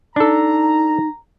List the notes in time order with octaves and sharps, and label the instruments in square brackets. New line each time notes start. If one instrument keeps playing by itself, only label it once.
[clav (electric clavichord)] D4 A4 [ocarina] D#4 [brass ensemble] A#5